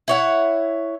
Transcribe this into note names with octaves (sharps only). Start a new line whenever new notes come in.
E4 C#5 F#5